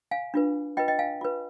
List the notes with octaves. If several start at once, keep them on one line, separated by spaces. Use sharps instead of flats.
F5 G#5
D4 F4 B4
F4 B4 D#5 G5
D#5 G5
F5 G#5
F4 B4